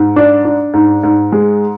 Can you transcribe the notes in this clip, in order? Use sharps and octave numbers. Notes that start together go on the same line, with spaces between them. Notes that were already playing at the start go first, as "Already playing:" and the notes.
Already playing: G#2
D4
D4
G#2
G#2
G#3